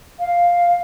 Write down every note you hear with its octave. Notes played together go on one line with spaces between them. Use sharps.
F5